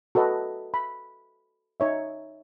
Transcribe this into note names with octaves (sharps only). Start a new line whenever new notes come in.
F#4 A4 B4 D#5
B5
D#4 C#5 E5